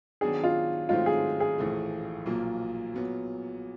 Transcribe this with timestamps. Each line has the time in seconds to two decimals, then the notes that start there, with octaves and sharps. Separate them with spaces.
0.21 D#3 F#3 B3 D4 F#4 G#4
0.44 F4
0.89 G#2 D#3 F#3 A3 C4 F4
1.06 G#4
1.40 G#4
1.58 A#1 A2 E3 A3
2.26 B1 A#2 F3 A#3
2.94 A#2 F#3 B3